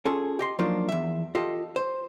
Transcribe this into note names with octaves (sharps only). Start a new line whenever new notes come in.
C#4 F4 G#4 A4
G4 D#5 C6
F3 F#3 A#3 D4 D#4 F4
E2 E5
F4 G4 A4 D#5
C5